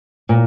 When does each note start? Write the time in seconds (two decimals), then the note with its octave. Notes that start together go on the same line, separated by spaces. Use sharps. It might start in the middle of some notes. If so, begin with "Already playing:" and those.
0.29 A#2